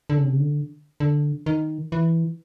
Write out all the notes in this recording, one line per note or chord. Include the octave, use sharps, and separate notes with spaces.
D3
C#3
C3
C#3
D3
D3
D#3
E3